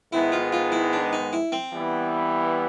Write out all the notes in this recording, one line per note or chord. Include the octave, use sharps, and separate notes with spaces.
G#2 D#3 G#3 B3 E4
F4
F4
E4
D4
D#4
E4
C4
E3 G3 B3 E4